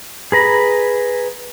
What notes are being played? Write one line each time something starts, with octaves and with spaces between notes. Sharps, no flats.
G#4 B4 A#5 B5